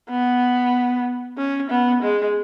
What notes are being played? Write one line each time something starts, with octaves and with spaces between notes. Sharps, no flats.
B3
C#4
B3
G#3